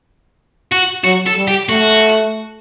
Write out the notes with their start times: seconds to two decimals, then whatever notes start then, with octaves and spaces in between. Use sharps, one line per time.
0.72 F#4
1.04 F#3 F#4
1.26 A4
1.37 G3
1.48 G4
1.69 A3 F#4